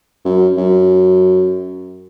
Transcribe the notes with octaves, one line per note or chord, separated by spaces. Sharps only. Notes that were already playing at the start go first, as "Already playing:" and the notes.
F#2
F#2